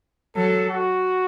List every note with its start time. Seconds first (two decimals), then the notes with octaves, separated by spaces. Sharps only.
0.36 F#3 A4
0.70 F#4